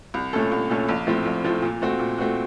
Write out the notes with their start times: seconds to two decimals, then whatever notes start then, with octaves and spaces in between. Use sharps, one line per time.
0.14 C2
0.33 A#2 A3 C#4 A4
0.52 C2
0.70 A#2 A3 C#4 A4
0.89 A#1
1.07 A2 F3 A3 C4
1.25 A#1
1.44 A2 F3 A3 C4
1.62 A#2
1.82 A3 C4 F#4
1.99 A#2
2.18 A3 C4 F#4